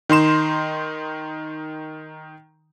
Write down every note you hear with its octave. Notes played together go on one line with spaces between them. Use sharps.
D#3 D#4 C6 E7